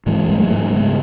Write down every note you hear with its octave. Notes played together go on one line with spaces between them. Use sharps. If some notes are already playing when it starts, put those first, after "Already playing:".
G#2 E3 G#3
G#2 G#3
F#3 A3
G#2
C#3 G#3 B3